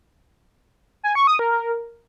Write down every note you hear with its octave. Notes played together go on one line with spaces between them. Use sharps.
G#5
C#6
D#6
A#4
A#4